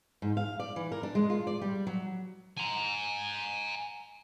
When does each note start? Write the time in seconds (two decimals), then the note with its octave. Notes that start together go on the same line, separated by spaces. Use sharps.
0.22 G#2
0.37 F5
0.60 D5
0.76 E3
0.92 A#4
1.03 D4
1.15 G#3
1.30 F4
1.47 D5
1.61 G3
1.87 F#3
2.57 G#5 A#5